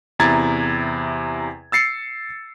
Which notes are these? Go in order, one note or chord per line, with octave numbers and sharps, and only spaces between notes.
E2 C3 E4 A#5 G#6 A6
E6 A6 C7 C#7